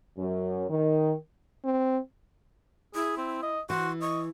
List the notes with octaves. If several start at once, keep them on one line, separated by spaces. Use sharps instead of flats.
F#2
D#3
C4
E4 G#4
C4
D#5
E3 F#4 C6
D#5 C#6